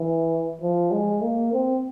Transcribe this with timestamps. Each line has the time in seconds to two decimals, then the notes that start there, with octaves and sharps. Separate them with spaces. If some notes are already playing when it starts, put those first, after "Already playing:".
Already playing: E3
0.61 F3
0.91 G#3
1.22 A#3
1.53 C4